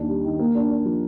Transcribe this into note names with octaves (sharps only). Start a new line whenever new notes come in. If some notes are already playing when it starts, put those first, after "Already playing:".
Already playing: D#2 D4
G3
D#3
A#3
D4
D4
F3